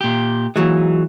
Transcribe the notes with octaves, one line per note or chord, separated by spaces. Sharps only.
A#2 G4
A#2 E3 F#3 G#3